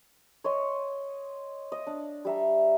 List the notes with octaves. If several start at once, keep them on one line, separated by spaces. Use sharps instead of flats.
C#5 D#5 C6
D#5
D4
G3 E5 A#5